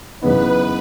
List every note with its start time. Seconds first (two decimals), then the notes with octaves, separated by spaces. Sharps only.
0.21 F#2 C#3 E3 B3 D#4 B4